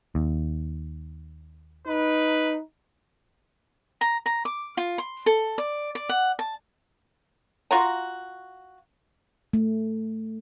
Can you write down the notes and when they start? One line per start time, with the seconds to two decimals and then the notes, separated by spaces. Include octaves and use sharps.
0.15 D#2
1.87 D#4 B4
4.01 A#5
4.26 A#5
4.45 D6
4.77 F4
4.98 C6
5.26 A4
5.58 D5
5.95 D5
6.09 F#5
6.39 A5
7.71 F4 F#4 A#5
9.53 A3